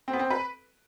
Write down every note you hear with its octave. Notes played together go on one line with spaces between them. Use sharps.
C4
B3
C4
B4